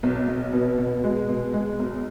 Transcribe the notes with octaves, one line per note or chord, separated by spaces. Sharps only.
B1
B1
B2
B2
G#3
B2
G#3
B1